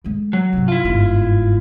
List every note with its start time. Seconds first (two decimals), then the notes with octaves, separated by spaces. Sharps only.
0.04 D3 G#3
0.33 F#3
0.53 G2 C3
0.68 E4 F4
0.84 G1 G#2